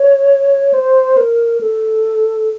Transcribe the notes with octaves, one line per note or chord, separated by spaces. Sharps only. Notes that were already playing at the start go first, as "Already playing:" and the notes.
Already playing: C#5
C5
A#4
A4